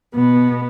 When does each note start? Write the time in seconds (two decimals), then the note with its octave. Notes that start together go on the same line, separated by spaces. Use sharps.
0.14 B2 B3